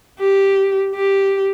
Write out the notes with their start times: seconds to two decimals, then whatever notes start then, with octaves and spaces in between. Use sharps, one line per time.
0.20 G4
0.95 G4